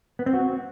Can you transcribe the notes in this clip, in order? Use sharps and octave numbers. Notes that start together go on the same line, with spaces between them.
B3
C4
F#4